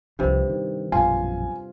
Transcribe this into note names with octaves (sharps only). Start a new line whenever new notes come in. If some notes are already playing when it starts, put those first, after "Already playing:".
C2 G2 C3 F3
D#3
A#1 F#2 B2 F4 G#5